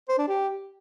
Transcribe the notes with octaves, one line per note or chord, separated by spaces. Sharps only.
C5
D4
G4